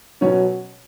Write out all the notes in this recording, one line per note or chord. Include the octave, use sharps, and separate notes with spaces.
B2 F#3 C#4 C#5